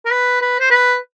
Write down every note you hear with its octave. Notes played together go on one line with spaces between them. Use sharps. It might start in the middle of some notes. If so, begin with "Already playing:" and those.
A#4
B4
B4
C5
B4